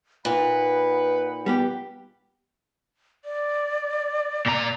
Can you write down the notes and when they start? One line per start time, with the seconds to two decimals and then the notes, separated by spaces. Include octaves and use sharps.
0.25 A#2 D#4 B4 F#5 B5
1.46 G3 B3 G4
3.25 D5
4.46 A#2 A#5